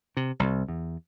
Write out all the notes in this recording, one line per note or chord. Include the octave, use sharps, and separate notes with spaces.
C3
C2
E2